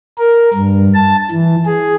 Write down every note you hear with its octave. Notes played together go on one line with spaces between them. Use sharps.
A#4
G2
A5
E3
G#4